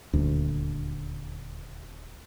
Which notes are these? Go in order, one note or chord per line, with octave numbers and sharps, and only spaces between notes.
D#1 D2